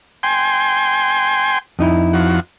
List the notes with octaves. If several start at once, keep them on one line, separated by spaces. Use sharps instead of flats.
G5 G#5 C6
F2 D#4 E4
F3 F#4